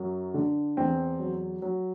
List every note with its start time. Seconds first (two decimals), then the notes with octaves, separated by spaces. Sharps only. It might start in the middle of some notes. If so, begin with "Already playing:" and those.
Already playing: F#2 F#3
0.34 D3
0.77 E2 C4
1.20 F#3
1.62 F#3